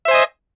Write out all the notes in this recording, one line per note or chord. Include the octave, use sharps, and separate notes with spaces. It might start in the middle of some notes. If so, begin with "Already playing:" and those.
C5 D#5 E5 G#5